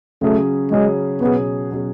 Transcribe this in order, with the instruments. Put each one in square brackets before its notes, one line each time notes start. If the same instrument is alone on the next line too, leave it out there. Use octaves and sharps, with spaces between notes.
[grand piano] C#3 F#3 C#4 G#4 [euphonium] A3
[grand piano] C#3 F#3 C#4 G#4 [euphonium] G#3
[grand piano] B2 F#3 C#4 G#4 [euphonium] B3
[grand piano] B2 F#3 C#4 G#4